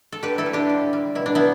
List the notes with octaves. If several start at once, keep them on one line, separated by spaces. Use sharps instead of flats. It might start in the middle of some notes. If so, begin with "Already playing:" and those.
A4
D3 G4 B4
E4 A4
G3
D4 G4
D3
G3
B2 E4
D4
B3 E4